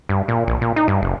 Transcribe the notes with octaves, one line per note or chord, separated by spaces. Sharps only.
G2
A#2
A#1
A#2
D#4
G2
F#1